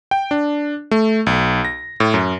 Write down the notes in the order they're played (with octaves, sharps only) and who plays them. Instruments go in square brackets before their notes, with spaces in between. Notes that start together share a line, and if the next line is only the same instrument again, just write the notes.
[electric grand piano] G5
D4
A3
B1
A#6
A2
F#2